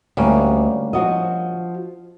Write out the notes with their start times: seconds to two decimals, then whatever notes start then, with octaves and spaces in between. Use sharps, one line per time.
0.17 D2 G3 A#3 C#4
0.93 F3 F#4 D#5